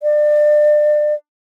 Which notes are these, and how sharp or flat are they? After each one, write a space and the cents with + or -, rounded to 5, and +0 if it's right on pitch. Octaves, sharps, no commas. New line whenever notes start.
D5 +30